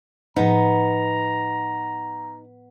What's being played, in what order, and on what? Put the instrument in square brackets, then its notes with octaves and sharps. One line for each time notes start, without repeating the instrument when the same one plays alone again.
[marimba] A2 F3 [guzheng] B3 [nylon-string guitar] D#4 [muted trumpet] A#5